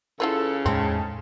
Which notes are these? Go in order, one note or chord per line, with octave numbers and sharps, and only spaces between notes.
C#3 E4 F4 A4 B4
E2 A2 G#3 C4 C#4 D#4 A5